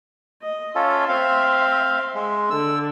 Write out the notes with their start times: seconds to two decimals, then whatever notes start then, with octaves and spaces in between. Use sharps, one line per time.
0.42 D#5
0.75 C#4 F4 A4 E5 C6
1.09 C4 F5
2.15 G#3
2.51 D3 E6